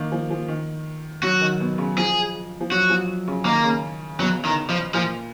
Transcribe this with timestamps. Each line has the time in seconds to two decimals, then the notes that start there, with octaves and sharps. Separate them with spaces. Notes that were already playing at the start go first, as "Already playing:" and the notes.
Already playing: D#3 A#3
0.12 F3
0.31 F3
0.48 D#3
1.23 F#3 F#4
1.41 D#3
1.60 B2
1.78 C#3
1.97 F3 G#4
2.61 F3
2.71 F#3 F#4
2.90 F3
3.28 C#3
3.45 D#3 A#3
3.64 C#3
4.20 B2 F#3
4.45 D#3
4.69 F3
4.94 A#2 F3